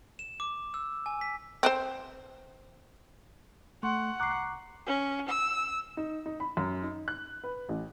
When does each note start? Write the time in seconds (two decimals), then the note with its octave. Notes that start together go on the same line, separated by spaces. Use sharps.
0.19 E7
0.40 D6
0.74 E6
1.06 G#5
1.21 B6
1.63 C4 B4 C5
3.83 A3 F#5 C6 C#6
4.20 C2 A#5 C#6 D6 F#6 C7
4.87 C#4
5.29 E6
5.97 D#4
6.26 D#4
6.40 B5
6.57 F#2
6.83 D#4
7.08 F#6
7.44 B4
7.69 A1